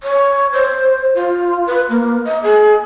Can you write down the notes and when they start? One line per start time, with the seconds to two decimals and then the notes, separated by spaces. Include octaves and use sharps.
0.03 C#5
0.52 C5
1.14 F4
1.67 B4
1.89 A#3
2.25 D#5
2.44 G#4